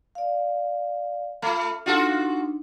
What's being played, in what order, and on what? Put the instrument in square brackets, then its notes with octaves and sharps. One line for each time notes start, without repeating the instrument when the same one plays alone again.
[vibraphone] D5 F5
[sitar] A3 [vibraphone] F4 B5
[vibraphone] D4 D#4 [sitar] F4 F#4 A4